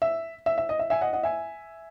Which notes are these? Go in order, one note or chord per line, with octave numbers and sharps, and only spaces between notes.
E5
E5
E5
D#5
E5
E5 G#5
D#5 F#5
D#5 F#5
E5 G#5